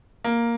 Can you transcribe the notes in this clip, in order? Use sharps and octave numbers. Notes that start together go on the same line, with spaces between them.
A#3